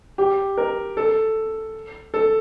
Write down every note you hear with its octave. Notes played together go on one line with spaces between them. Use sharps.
G4
A#4
A4
A4